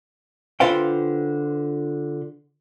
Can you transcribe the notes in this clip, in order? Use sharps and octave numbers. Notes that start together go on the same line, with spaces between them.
D3 F4 B4 C5 F5 G5